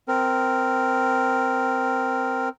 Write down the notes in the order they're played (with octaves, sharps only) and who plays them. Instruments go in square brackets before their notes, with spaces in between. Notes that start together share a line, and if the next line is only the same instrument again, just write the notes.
[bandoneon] C4 A#4